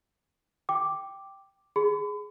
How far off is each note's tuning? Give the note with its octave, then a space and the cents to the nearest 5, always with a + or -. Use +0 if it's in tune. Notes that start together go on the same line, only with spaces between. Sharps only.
G5 +0 D6 +0
G#4 +0 B5 +40